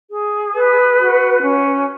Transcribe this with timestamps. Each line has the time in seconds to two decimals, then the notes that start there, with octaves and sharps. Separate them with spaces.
0.11 G#4
0.54 B4
0.98 F#4
1.41 C#4